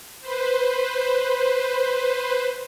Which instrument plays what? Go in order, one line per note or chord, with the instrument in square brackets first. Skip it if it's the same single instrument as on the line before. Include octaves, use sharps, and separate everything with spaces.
[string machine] B4 C5